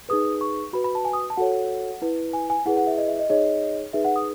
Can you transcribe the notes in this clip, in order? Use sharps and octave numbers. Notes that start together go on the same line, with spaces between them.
D#4 G#4 B4 D#6
C#6
F#4 B4 B5
B5
A5
G#5
D#6
A5
F#4 A4 C#5 F#5
E4 B4
G#5
G#5
E4 G#4 B4 F#5
F#5
E5
D#5
E5
D#5
D#4 G#4 C#5 D#5
D#4 G#4 B4 E5
F#5
D#6